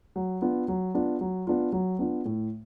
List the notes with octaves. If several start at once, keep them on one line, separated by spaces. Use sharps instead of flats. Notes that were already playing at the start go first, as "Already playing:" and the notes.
F#3
B3 D4 F4
F#3
B3 D4 F4
F#3
B3 D4 F4
F#3
B3 D4 F4
A2